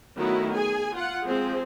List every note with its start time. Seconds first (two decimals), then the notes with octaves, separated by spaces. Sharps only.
0.17 D#3 F#3 A3 B3 E4 F#4
0.53 G#4 G#5
0.93 F4 F#5
1.25 F3 G#3 C4 G#4